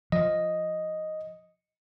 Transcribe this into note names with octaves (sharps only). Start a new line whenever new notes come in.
F3 D#5